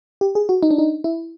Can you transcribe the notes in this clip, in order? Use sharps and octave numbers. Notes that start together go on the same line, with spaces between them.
G4
G#4
F#4
D#4
D4
D#4
E4